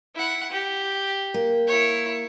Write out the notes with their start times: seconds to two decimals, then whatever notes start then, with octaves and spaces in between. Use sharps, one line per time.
0.15 E4 F#5
0.51 G4
1.34 A#3
1.67 E4 C#5